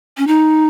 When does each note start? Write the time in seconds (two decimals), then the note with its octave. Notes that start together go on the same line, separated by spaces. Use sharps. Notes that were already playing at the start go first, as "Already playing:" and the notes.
0.18 C#4
0.27 D#4